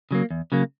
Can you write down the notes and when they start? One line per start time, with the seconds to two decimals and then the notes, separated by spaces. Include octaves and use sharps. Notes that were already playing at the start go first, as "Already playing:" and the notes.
0.11 C#3 F#3 A#3
0.30 E2
0.52 C#3 F#3 A#3